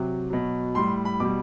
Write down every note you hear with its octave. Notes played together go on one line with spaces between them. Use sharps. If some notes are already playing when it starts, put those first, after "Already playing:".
Already playing: C3 F#3
B2 F#3
A2 G3 C6
B5
B2 G3 D6